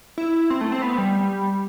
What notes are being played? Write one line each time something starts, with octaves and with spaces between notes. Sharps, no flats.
E4
C4
A3
C4
B3
G3